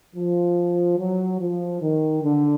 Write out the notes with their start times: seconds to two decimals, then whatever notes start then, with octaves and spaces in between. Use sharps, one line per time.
0.16 F3
0.99 F#3
1.40 F3
1.81 D#3
2.23 D3